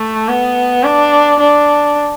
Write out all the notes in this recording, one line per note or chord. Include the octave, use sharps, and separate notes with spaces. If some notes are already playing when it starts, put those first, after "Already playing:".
Already playing: A3
B3
D4
D4